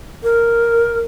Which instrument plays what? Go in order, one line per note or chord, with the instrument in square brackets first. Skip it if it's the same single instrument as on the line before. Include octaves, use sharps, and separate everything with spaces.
[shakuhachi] A#4